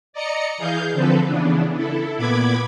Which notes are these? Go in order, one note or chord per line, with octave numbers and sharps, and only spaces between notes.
D5 D#5 A#5 C#7
E3 G#4 F5 G6
D3 F3 C4 A4 B4
C#3 E3 B3 D4
E4 A4
A#2 B3 B5 D6 G#6